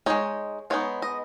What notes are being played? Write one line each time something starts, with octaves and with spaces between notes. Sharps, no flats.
G#3 D#4 C#5
G#3 B3 D#4 C#5
D#5